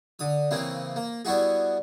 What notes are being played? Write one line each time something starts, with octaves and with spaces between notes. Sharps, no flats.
D3 D#6
C#3 E3 A#3 C4 E4
A#3
G3 B3 E4 F#4 G#4